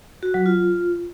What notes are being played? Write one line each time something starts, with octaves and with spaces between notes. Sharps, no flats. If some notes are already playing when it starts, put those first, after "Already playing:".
F#4
F#3
F4